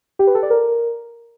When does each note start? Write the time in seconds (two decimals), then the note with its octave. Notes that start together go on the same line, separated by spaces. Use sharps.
0.19 G4
0.27 B4
0.35 A4
0.43 D5
0.50 A#4